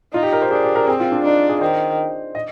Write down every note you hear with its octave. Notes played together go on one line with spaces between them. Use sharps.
D#4 F4
G4
A#4
C5
D4 G#4
G4
A#4
C4 G#4
F4
D4
D4 D#4
G#4
D#3 C5
D#5